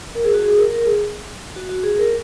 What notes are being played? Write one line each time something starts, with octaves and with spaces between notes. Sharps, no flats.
A#4
G#4
F#4
G#4
A#4
A#4
G#4
F#4
F#4
G#4
A#4